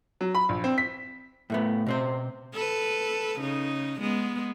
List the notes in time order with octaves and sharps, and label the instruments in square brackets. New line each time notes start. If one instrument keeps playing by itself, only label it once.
[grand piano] F#3
B5
A#1
C4
B6
[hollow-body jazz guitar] A2 A3 B3
B2 C4 C5
[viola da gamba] A4 B4
C#3 D#4
G#3 B3